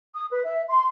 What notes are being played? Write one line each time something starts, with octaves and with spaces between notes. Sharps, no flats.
D#6
B4
E5
C6